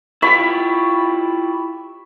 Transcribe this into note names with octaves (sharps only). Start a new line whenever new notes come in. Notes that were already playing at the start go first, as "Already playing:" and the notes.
E4 F4 G4 B5 C#6